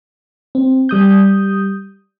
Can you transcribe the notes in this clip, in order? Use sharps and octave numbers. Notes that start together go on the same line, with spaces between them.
C4
G3 D#6 G6